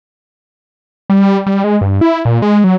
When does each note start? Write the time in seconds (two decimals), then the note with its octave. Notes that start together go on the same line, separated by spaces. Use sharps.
1.10 G3
1.46 G3
1.64 G#3
1.81 G2
2.01 E4
2.25 A#2
2.42 G#3
2.64 F#3